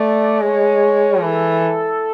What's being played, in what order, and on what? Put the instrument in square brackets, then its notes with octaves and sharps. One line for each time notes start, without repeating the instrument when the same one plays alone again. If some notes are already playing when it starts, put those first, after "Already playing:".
Already playing: [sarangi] A3 [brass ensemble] D5
[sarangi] G#3 [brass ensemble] C#5
[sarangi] E3 [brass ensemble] A4